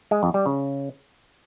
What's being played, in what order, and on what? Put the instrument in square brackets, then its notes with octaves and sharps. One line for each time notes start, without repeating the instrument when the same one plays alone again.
[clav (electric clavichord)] G#3
F2
G3
C#3